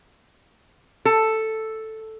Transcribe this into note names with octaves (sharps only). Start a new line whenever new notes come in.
A4